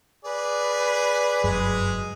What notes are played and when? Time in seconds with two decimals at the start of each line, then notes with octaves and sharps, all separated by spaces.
0.25 G#4 B4 D5
1.44 F#1 G2 F#3 G#3 G#4